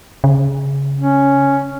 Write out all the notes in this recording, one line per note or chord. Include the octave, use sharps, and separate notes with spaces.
C#3
C#4